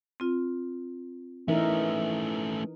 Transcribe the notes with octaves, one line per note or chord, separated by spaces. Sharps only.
C4 F4
E3 A3 C#4 D#4 A#4 E5